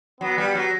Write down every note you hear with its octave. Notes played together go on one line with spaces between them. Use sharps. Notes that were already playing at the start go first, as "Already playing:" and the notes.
F#3 B3
G3
F#3